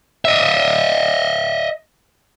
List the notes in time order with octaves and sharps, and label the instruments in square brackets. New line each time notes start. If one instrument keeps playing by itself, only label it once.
[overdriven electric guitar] D#5 E5